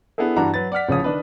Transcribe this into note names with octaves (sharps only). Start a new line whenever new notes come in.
B3 D4 E4 G#4 A4
G2 E3 D4 F#4 A#5
F#3 B4 A6
D5 F#5 F6 B6
A1 C#3 F3 C#5 D#6
D#3 D4 B4